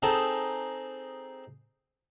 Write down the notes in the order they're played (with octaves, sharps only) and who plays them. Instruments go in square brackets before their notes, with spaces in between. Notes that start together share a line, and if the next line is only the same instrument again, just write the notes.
[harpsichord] C4 D#4 G#4 A4